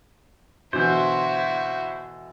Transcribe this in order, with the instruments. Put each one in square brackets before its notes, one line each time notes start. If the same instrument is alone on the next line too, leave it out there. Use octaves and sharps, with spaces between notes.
[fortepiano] B2 D3 E3 [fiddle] E4 F#4 [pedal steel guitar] C5